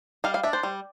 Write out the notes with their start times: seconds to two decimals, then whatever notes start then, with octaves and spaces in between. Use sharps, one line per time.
0.24 G3 F5
0.34 F5
0.43 D4 E5
0.53 C5
0.63 G3